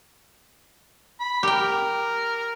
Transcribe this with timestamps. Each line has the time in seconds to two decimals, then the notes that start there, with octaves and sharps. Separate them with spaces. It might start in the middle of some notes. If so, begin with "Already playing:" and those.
1.20 B5
1.43 G4 A#4 G5